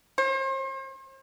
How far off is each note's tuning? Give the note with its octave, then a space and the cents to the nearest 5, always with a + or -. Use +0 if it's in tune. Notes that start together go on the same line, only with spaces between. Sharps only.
C5 +40